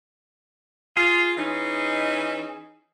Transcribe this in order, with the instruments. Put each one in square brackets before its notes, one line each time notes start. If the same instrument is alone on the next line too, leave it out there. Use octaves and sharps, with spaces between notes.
[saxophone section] F4 [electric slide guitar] G#4
[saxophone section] E3 C#4 D#4